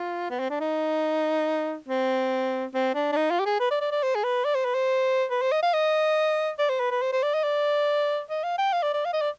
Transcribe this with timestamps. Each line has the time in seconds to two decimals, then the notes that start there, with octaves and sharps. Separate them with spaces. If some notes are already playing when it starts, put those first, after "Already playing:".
Already playing: F4
0.30 B3
0.39 C4
0.50 D4
0.60 D#4
1.88 C4
2.74 C4
2.95 D4
3.12 D4
3.16 D#4
3.31 F4
3.40 G4
3.46 G#4
3.60 B4
3.71 D5
3.81 D5
3.92 D5
4.03 C5
4.15 G#4
4.24 B4
4.45 D5
4.55 C5
4.65 B4
4.75 C5
5.31 B4
5.42 C5
5.52 D#5
5.63 F5
5.73 D#5
6.59 D5
6.69 C5
6.80 B4
6.91 B4
7.02 C5
7.12 C5
7.23 D5
7.34 D#5
7.44 D5
8.30 D#5
8.43 F5
8.58 G5
8.73 F5
8.83 D5
8.94 D5
9.05 F5
9.13 D#5
9.21 D5